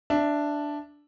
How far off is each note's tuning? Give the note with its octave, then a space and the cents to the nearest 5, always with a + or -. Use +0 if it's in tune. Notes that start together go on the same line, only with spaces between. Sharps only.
D4 +0 E5 +10